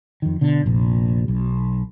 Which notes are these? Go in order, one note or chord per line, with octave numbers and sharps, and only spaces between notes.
F2 D#3
B2 D3
F1 A#1
B1